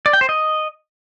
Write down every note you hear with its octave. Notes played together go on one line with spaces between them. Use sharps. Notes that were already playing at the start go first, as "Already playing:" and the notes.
D5
G5
C5
D#5